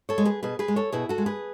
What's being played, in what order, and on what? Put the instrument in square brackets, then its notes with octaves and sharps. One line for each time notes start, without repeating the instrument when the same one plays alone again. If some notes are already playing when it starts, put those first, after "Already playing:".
[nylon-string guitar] A4 C#5
G#3
G#4 B4
B2 G#4 B4
G#4 B4
G#3
A4 C#5
B2 E4 G#4
F#4 A4
G#3
G#4 B4